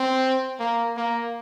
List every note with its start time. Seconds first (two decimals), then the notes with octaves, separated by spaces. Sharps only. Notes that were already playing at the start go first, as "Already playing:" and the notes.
Already playing: C4
0.60 A#3
0.97 A#3